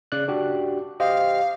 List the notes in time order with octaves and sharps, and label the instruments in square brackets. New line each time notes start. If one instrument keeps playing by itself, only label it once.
[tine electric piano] C#3 D5 F#6
D4 F#4 G4
[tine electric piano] G4 C5 D#5 [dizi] F5